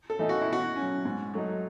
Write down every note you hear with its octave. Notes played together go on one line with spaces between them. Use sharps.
A4
E3 A3 D#4
F#4
E4
B2 F#4
F#3 C#4
G#2
F#3 A3 D#4